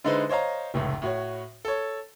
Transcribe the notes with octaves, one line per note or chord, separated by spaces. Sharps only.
D3 G#3 D#4 E4 B4 C5
C5 C#5 D#5 F5 A#5
F1 C#2 A2
A2 F#4 C#5
A4 C#5